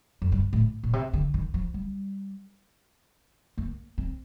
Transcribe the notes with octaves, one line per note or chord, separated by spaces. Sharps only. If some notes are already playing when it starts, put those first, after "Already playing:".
F2
G2
A2
A#2
C3
D3
D#3
F3
G3
A#3
C4